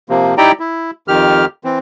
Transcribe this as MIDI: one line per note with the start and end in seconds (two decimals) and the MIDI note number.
0.09 0.35 48
0.09 0.35 53
0.09 0.35 58
0.38 0.52 63
0.38 0.52 64
0.38 0.52 67
0.38 0.52 74
0.38 0.52 79
0.38 0.52 82
0.60 0.91 64
1.08 1.45 41
1.08 1.45 51
1.08 1.45 67
1.08 1.45 89
1.64 1.79 52
1.64 1.79 60